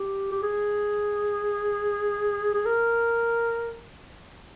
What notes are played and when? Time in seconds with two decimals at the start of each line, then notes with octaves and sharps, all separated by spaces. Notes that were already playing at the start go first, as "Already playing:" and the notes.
Already playing: G4
0.31 G4
0.43 G#4
2.54 G#4
2.65 A#4